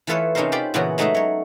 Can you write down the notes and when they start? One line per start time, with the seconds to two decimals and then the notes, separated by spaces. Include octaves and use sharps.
0.07 E3 A3 F4 A4 B4 C#5
0.35 C3 C#4 D#4 A4 A#4 C5
0.52 F4 G4 C5 D5 B5
0.74 A#2 C#3 E3 B3 C#4 F#4
0.98 G#3 A3 D#4 F#4 G#4 E5
1.14 F#3 C#5